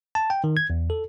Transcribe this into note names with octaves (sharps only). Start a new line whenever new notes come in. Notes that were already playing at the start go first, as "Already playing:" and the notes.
A5
G5
D#3
G#6
E2
A4